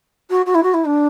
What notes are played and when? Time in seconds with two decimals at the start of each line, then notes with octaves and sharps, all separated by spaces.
0.30 F#4
0.46 F#4
0.54 E4
0.63 F#4
0.73 E4
0.85 D4